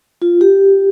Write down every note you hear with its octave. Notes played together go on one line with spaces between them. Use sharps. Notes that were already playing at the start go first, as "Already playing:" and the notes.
F4
G4